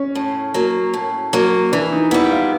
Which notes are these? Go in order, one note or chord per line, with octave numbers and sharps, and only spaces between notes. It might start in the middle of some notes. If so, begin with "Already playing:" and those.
Already playing: C#4
A2
F#3 A#3
A2
F#3 A#3
E3 D4
D#4
G3 B3 E4
F4